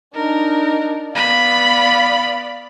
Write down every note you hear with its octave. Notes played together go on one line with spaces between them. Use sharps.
D4 D#4 A#4
B3 D5 F5 B5